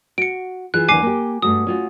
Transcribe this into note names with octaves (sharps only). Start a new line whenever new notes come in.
F#4 C#7 D7
E3 F4 G#4 F#6
D#2 D3 E3 G#5 D6 C7
A#3 G4
G2 A3 F#4 D#6
C#4 F4 F#4